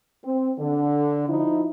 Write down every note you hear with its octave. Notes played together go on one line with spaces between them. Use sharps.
C4
D3
F3 D#4 E4